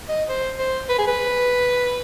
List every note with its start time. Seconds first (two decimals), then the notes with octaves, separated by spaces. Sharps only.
0.09 D#5
0.29 C5
0.59 C5
0.89 B4
0.99 G#4
1.08 B4